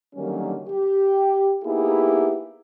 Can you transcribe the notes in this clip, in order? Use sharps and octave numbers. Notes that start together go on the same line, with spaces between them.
D3 D#3 F#3 G3 A#3 C#4
G4
A#3 B3 D#4 E4 G4 G#4